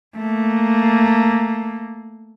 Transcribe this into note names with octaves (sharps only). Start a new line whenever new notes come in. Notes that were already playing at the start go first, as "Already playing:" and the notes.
A3 A#3